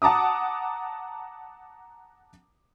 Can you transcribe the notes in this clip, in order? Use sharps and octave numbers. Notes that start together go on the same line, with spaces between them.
F#5 A5 A#5 D6 D#6